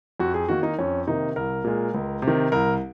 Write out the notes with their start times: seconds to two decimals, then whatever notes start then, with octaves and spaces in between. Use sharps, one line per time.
0.20 F2 F#4
0.34 G#4
0.48 D#3 A#3 F#4
0.63 D#4
0.79 F2 C#4
1.07 C3 D#3 A#3 D#4
1.36 C2 A#4
1.64 A#2 G#3
1.94 C#2
2.22 C3
2.28 D#3
2.52 C2 A#4